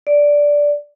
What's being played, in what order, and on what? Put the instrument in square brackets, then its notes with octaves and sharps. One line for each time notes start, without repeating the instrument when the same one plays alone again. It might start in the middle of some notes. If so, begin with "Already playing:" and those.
[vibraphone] D5